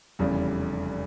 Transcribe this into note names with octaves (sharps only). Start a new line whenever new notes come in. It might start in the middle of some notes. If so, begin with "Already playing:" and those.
F1 E2 C#3 G3